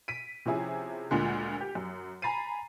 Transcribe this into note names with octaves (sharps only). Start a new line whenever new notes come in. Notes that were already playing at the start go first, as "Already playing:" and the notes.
B6 D7 D#7
C3 F3 C#4 E4 G#4
D2 A#2 D3 G#3
G4
F#2
G#5 A#5 B5 A6 C7 D#7